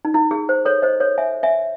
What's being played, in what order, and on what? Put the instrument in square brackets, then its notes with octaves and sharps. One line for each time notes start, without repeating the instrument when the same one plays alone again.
[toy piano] D#4
E4
G#4
C5
A4 C#5
C5 D#5
A4 C#5
E5 G#5
E5 G#5